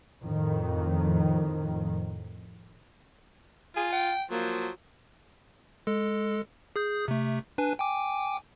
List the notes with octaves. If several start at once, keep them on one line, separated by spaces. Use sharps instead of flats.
F2 A2 D#3
F4 G#5
G5
F3 F#3 A#3
G#3 A4
G#4 D#6 G6
C3 A3
D4 B4 G#5
G5 G#5 D6